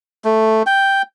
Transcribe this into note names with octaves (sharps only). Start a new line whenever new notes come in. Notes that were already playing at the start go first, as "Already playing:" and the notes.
A3
G5